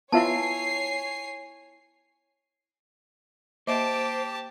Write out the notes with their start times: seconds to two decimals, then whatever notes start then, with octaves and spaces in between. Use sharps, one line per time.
0.12 B3 E4 F4 C#5 E5 G#5 A5 C7
3.67 A#3 G4 C5 D#5 E5 A5 D6